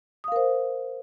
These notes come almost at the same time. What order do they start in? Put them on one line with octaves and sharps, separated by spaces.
D#6 F5 A#4 C5